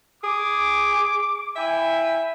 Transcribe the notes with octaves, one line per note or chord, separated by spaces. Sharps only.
G#4 D6
E4 E5 G5 G#5